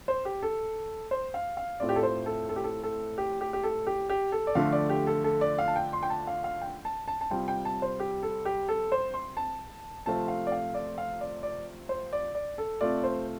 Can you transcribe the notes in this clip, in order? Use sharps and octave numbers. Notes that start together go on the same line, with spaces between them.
C5
G4
A4
C5
F5
F5
A2 A3 C4 F4 D5
G4
A4
C5
A4
A4
G4
A4
A4
G4
G4
G4
A4
G4
G4
A4
D5
D3 F3 A3 D4 F4 F5
D5
G4
A4
A4
D5
F5
A5
G5
C6
G5
A5
F5
F5
G5
A5
A5
A5
C3 G3 C4 F4 G5
G5
A5
C5
G4
A4
G4
A4
C5
C6
A5
C3 F3 A3 C4 F4 A5
F5
D5
F5
D5
F5
D5
D5
C5
D5
D5
A4
C3 A3 F4 D5
C5